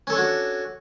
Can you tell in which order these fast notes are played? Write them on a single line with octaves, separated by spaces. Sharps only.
C#4 A4 C#5 D4 F#4